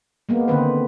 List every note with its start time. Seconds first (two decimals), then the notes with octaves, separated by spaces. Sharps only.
0.29 G#3 A#3 B3
0.48 D3 D#3 C4 B4